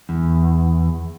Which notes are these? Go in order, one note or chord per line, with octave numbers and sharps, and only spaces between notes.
E2